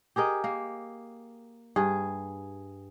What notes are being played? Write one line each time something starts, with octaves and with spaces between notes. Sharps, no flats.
G4 G#4 A#4 D#5
A#3
G2 G#4